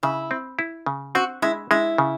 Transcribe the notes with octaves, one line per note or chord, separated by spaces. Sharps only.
C#3 E4
C4
E4
C#3
C4 F#4
G#3 E4
G#3 E4
C#3